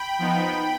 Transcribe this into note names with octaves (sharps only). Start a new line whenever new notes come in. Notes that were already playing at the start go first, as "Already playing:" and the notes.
Already playing: G5 B5
F3 B3 D#4